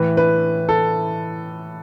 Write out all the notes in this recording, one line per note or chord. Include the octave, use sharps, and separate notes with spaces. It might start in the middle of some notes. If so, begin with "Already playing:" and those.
Already playing: A2 E3 B4
B4
A4